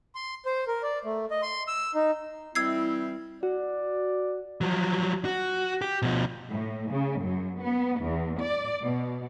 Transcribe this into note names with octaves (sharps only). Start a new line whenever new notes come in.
C6
C5
A#4
D5
A3
D#5
C6
E6
D#4
E3 G3 C4 E4 E6 G#6 C7
F#4 D5
F3 F#3
F#4
G4
B2 F3
A2
C#3
F#2
B3
E2
D5
B2